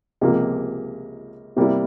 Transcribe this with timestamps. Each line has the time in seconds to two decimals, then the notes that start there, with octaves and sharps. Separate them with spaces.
0.21 C#2 C3 F3 A#3
1.57 C3 G3 A#3 E4